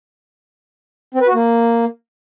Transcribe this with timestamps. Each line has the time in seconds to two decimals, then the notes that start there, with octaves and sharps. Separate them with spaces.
1.14 C4
1.21 B4
1.28 F#4
1.34 A#3